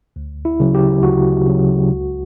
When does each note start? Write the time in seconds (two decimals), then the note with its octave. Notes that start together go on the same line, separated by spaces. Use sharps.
0.16 D2
0.45 E4
0.60 C#3 F#3
0.75 G4
1.02 D2 F#4
1.46 C#3 F#3
1.90 C#2